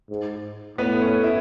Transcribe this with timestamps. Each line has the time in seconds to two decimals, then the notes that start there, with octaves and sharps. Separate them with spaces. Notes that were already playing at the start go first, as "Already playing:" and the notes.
0.09 G#2
0.78 A2 B3 B4
1.01 C#4 C#5
1.24 E4 E5